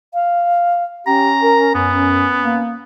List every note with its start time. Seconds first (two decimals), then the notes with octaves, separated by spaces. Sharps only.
0.14 F5
1.07 C#4 G4 A#5
1.43 A#4
1.75 F#2 B3
2.43 A#3